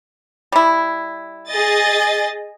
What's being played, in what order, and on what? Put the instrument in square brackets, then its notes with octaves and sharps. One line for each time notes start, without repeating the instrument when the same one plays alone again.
[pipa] G3 E4
[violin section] G#4 D#5 A6